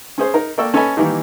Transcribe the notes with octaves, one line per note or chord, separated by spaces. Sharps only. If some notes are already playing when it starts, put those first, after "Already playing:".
C#4 G#4 C5
D#4 A#4
A#3 A4 D5 G5 C#6 E6
C#4 A4 B4 D#5 G#5 B5
D#3 E3 G3 A#3 D#4 E4